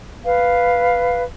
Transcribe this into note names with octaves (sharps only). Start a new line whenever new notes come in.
B4 F5